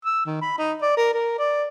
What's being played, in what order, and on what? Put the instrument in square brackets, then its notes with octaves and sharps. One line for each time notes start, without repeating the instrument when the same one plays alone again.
[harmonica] E6
D#3
B5
D#4
D5
A#4
A#4
D5